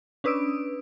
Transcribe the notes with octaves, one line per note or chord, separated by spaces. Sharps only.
C#4 D4 B4 D#6 E6 D7